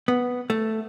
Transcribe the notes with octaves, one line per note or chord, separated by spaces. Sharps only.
B3
A3